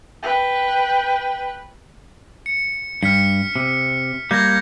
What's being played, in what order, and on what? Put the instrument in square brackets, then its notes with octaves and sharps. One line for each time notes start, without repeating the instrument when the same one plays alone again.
[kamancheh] B4 G5
[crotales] C#7
[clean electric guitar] G2 [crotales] F6 B6 C#7
[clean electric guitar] C3
[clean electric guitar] G3 A#3 [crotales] G6 G#6 A#6